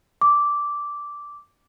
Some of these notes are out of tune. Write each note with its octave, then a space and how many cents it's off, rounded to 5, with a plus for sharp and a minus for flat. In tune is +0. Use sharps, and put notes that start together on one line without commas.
D6 -10